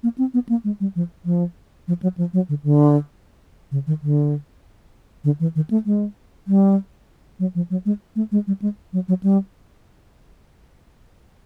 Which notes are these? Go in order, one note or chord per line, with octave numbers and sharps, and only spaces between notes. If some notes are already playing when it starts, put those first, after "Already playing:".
A#3
C4
B3
A#3
G#3
G3
F3
F3
F3
F#3
F3
F#3
D3
D3
C#3
D#3
D3
D3
E3
D#3
A3
G#3
G3
F#3
F3
F#3
G#3
A3
G#3
G3
G#3
F#3
F#3
G3